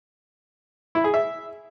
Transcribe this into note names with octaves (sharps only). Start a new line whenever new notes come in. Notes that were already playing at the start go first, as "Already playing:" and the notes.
E4
G#4
E5